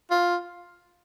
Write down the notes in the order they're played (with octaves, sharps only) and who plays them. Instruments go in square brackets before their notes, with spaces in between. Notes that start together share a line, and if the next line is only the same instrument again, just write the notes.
[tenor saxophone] F4